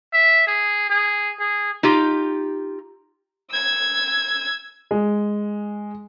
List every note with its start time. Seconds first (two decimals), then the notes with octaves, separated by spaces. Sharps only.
0.13 E5
0.47 G#4
0.90 G#4
1.40 G#4
1.83 D#4 F4 G4
3.52 E6 G#6
4.91 G#3